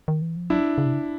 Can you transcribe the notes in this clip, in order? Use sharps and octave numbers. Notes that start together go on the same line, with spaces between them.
D#3
E3
F3
F#3 D4 E4
C#3
C3
C#3